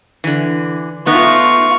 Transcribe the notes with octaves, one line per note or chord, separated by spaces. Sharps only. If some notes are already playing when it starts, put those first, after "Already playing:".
D3 E3
A3 B3 D#4 F4 C#6